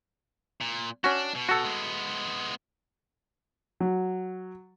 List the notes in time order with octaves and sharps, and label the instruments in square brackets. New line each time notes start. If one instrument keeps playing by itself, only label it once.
[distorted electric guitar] A#2
[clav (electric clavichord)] C#4 F#4 [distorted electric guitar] D4
[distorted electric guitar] B2
[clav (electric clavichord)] F#4 A4
[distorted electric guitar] G#3 B3
[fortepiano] F#3